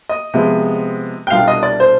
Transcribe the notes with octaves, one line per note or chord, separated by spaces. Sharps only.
D#5
C3 F3 G#3 B3
G5
C2 B2 G3 D4 F4 F5
D#5
D5
C5